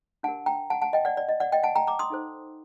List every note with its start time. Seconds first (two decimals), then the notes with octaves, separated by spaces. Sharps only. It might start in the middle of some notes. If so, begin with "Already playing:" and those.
0.23 D4 G4 A#4 F#5 A5
0.46 G5 A#5
0.70 F#5 A5
0.82 F#5 A5
0.93 D#5 G5
1.05 D5 F#5
1.17 D5
1.29 D#5
1.40 D5 F#5
1.52 D#5 G5
1.63 F#5 A5
1.76 G5 A#5
1.87 A#5 D6
1.99 C6 D#6
2.10 D#4 A4 C5